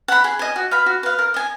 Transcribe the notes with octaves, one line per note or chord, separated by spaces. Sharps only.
F#5 B5
G#4
D#5 G#5
F#4
B4 F5 B5
F#4
B4 F5
A#4
D#5 G#5